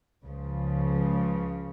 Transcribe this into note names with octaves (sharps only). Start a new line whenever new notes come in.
C#2 C#3 F3